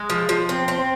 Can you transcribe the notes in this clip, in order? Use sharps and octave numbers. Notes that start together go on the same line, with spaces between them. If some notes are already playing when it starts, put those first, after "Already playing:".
Already playing: G#3
F3
F3
C4
C4